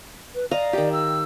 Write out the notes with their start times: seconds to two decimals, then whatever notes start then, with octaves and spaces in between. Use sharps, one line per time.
0.35 B4
0.51 D5 D#5 F5 A#5
0.73 D#3 G4
0.92 E6